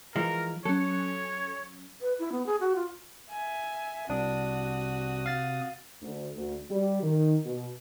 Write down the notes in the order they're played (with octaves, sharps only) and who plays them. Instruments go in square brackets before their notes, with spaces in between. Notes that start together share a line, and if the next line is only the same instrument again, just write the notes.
[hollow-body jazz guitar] E3 F3 G#3 [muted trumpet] A#4
[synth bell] F#3 C#4 [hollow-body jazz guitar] A4 [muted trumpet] C#5
[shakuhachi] B4
E4
B3
G#4
F#4
F4
[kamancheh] E5 G#5
[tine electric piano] C2 D4 [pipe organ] C3 D#6 [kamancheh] F#4
[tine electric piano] F5 A6
[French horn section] D2
D2
G3
D#3
B2